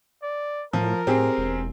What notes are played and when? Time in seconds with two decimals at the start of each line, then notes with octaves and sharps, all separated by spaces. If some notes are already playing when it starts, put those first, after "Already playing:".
0.23 D5
0.73 A2 F3 A#4
1.07 A2 C4 G4 G#4
1.38 E1